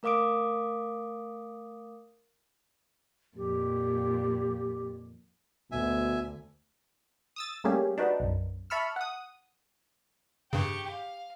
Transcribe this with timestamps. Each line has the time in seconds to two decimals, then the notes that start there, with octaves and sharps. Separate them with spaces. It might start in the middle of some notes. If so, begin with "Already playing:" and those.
0.03 A3 A#4 F5 D6 D#6 D7
3.37 F2 A#2 G4
5.72 D2 B2 E5 G#5
7.36 D#6 E6 A6
7.64 G3 A3 A#3 C#4 G4 G#4
7.98 D4 D#4 F#4 B4
8.20 B1 F#2
8.70 E5 A5 B5 C#6 E6 F6
8.96 F#5 D#6
10.53 G2 C#3 G4 C#6
10.90 F5